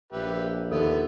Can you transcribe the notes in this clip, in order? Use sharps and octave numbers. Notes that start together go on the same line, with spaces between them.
A#1 G4 B4 E5
D#2 D3 B3 A4 E5